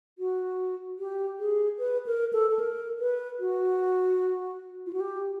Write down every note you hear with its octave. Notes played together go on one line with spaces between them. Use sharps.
F#4
G4
G#4
B4
A#4
A4
A4
A#4
B4
F#4
F4
F#4
G4